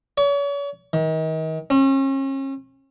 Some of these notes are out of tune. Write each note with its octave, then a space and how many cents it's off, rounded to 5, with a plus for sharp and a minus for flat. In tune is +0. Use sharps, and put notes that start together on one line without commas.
C#5 +40
D#3 +35
C#4 -40